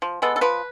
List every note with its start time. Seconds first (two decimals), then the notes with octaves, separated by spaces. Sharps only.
0.02 F3
0.22 G#3 B3 A4
0.36 A4
0.41 F3 B4